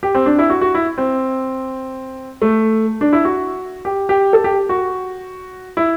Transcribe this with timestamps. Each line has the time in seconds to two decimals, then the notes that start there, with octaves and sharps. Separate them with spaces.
0.03 G4
0.15 C4
0.26 D4
0.39 E4
0.50 F#4
0.61 F#4
0.75 E4
0.98 C4
2.42 A3
3.01 D4
3.13 E4
3.25 F#4
3.85 G4
4.09 G4
4.33 A4
4.44 G4
4.69 F#4
5.77 E4